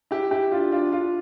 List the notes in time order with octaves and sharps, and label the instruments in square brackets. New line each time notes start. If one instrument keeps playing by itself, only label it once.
[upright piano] E4 G4
E4 G4
D4 F4
D4 F4
D4 F4